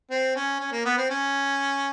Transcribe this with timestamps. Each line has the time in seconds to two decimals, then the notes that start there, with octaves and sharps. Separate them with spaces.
0.10 C4
0.36 C#4
0.60 C#4
0.72 A#3
0.85 B3
0.97 C4
1.10 C#4